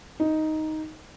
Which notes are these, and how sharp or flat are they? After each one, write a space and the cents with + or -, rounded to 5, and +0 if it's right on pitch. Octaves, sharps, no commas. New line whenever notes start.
D#4 +5